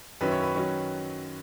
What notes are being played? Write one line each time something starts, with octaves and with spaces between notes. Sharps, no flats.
F#2 D#3 F#3 C#4 E4 B4
C#5
B4
D#3 F#3 C#4